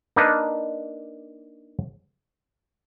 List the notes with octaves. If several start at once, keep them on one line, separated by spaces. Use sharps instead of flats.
A#3 D4 D#4 B4